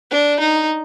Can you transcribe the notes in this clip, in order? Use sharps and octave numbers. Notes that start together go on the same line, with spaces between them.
D4
D#4